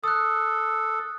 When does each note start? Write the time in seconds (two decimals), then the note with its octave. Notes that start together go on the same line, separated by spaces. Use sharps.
0.04 A4 D#6 F#6